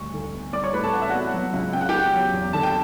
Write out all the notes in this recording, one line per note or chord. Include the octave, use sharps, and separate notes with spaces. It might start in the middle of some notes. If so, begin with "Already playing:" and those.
Already playing: D2 G3 C#6
D3
B3
G3 D5 D6
C#5 C#6
A2 B4 B5
A4 A5
E3 F#5
E5
B3 F#4 F#5
F#3
C#2
C#3 G5
F#5
B3 G4 G5
F#3
E2
D3 A5
G5